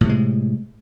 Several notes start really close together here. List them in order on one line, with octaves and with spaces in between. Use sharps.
A2 C3 G#3